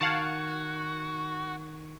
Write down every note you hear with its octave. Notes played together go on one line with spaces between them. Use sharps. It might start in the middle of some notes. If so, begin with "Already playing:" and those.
D#3 F#4 F5 F#5 A5 C#6 G#6